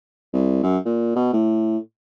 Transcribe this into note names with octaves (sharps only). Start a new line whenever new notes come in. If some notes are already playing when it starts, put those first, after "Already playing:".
C2
F#2
A#2
B2
A2